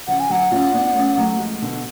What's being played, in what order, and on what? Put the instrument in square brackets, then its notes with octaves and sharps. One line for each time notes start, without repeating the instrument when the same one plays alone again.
[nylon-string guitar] C#3 F3 [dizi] F#5
[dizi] G#5
[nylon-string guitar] D3 F#3 [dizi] F#5
[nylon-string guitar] C#4 F4
B3 D4
A3 C#4
F#3 A3
F3 G#3
B2 D3